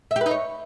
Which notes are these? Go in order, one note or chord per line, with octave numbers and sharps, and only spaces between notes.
E5
G4
B4
D#4
C#5